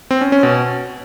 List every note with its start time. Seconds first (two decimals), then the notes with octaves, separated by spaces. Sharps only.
0.11 C4
0.21 C#4
0.32 C#4
0.43 B2